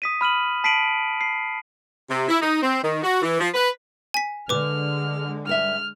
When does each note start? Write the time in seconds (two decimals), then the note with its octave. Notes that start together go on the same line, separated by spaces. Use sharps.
0.02 D#6 B6 D#7
0.21 B5 F6 D#7 F#7
0.64 A5 B6 C7 D7 D#7 F#7
1.21 C7
2.10 C3
2.28 E4
2.42 D#4
2.62 C4
2.83 D#3
3.03 F#4
3.22 E3
3.40 F3
3.54 B4
4.14 G#5 B6
4.49 D3 G#3 B4 D6 F6
5.47 G2 A4 E5 F6